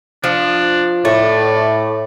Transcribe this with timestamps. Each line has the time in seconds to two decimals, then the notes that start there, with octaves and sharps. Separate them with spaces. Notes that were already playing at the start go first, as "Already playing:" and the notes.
0.24 F3 D4
1.05 A2 A3 D5